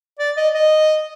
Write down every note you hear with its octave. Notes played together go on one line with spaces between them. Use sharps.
D5
D#5
D#5